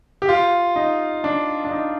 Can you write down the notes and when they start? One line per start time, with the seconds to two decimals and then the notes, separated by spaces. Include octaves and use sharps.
0.22 G4
0.29 F4
0.76 D#4
1.24 D4
1.65 D4
1.71 D#4